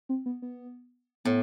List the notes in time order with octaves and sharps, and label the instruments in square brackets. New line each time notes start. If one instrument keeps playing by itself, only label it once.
[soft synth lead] C4
B3
B3
[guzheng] A2 [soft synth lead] B3